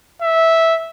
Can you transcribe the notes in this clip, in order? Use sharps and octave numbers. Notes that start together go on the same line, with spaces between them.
E5